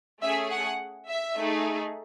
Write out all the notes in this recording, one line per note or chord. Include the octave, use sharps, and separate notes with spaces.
A3 C#4 G#4 E5
F#5
E5
A3 D#4 G#4